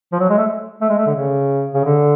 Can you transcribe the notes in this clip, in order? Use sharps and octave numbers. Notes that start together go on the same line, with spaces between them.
F3
F#3
G#3
A3
A3
G#3
A3
D3
C#3
C#3
D3